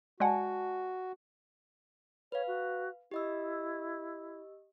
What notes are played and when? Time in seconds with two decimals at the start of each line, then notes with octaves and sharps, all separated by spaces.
0.20 G#3 F#4 D5 F#5 G#5 A5
2.32 B4 C#5 F5
2.47 F#4
3.11 E4 G4 D#5 E6